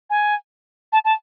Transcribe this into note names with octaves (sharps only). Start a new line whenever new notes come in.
G#5
A5
A5